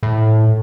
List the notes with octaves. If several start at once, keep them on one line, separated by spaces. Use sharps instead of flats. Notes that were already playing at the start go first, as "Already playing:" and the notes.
A2